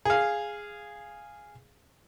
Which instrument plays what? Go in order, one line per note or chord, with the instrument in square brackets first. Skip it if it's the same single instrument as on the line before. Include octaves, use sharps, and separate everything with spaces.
[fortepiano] G#4 F5